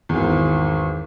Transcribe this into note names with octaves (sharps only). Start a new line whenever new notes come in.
G#1 E2